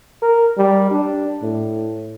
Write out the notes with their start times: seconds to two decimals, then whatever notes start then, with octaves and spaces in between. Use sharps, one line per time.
0.23 A#4
0.58 G3
0.91 D4
1.43 A2